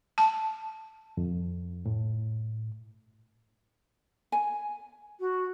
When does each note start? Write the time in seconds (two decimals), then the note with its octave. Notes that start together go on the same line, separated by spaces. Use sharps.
0.18 A5
1.17 F2
1.86 A2
4.32 G#5
5.20 F#4